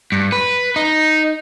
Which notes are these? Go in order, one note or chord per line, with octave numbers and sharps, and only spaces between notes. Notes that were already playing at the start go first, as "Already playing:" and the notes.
G2
B4
D#4